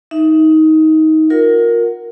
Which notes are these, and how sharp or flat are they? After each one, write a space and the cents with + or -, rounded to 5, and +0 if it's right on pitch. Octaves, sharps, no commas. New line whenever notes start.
D#4 +15 E5 +0
F4 +30 A#4 +0 F#5 +0